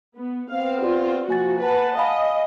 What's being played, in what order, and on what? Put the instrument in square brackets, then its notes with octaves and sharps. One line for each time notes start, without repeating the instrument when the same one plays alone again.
[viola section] B3
[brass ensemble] B3 C4 [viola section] F5
[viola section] F4 [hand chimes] G4 D5
[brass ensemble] C3 F3 [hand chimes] A#3 G#5 A6 [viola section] F#4
[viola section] B4 [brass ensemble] F#5 A5
[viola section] D#5 [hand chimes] F5 G#5 B5